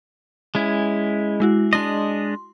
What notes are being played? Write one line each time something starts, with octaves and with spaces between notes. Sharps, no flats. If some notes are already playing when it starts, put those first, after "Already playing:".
G#3 C#4 E4
G#3 E4 F#4
G#3 D4 D#5 C6